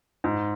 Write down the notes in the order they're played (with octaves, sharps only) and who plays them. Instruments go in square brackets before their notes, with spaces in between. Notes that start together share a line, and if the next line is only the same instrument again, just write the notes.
[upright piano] G#2